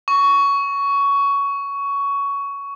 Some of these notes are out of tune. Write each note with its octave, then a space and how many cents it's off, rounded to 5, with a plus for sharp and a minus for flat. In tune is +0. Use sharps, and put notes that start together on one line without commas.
C#6 +15